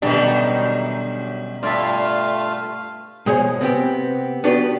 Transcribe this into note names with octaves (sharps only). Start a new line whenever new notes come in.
F#2 B2 D3 D#3 G3 D4
G2 A3 F4 D5 E5 F5
B2 G#3 G#4 C5 C#5 G#5
C3 B3 C4 G4
B3 D4 F#4 G4 A4 B4